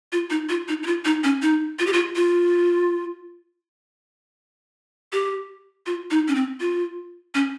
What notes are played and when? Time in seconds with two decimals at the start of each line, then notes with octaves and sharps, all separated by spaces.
0.12 F4
0.30 D#4
0.49 F4
0.68 D#4
0.83 D#4
0.87 F4
1.05 D#4
1.24 C#4
1.42 D#4
1.79 F4
1.87 G4
1.93 F4
2.16 F4
5.13 G4
5.86 F4
6.11 D#4
6.28 C#4
6.35 C4
6.60 F4
7.35 C#4